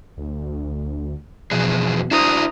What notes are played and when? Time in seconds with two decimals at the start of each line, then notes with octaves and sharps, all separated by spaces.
0.17 D2
1.51 E2 B2 F3 G#4
2.11 D4 E4 F#4 C5 A#5 D#6